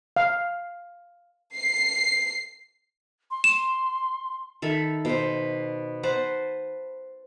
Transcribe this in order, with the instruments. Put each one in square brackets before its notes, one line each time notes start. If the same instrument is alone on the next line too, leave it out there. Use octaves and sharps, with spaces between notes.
[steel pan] F5
[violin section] C7
[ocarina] C6
[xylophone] E7
[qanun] D#3 A4 E5 B5
B2 C5
B4 C5 F#5 A5